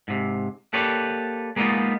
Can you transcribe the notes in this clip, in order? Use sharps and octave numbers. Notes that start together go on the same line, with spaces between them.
G#2 C3
A#3 G4 A4 B4 C#5 D5
G#3 A#3 B3 D4 D#4 F4